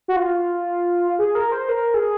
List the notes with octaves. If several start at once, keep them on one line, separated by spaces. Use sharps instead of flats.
F#4
F4
G#4
A#4
C5
A#4
G#4